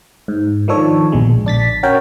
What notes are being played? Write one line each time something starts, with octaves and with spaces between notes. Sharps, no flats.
G#2
D#3 F3 D4 A4 C#5
A#1 B2 D3 G#3
A#1 D4 A6 B6
C#4 F#4 A#4 C#5 G5